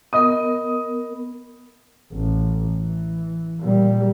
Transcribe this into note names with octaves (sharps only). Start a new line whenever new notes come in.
B3 A#4 D#5 D#6
A1
E3
A#2 G3